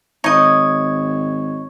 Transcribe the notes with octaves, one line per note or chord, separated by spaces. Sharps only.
G#1 D#4 C#5 D#5 C#6 G#6